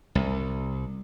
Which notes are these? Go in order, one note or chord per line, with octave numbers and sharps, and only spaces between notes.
C2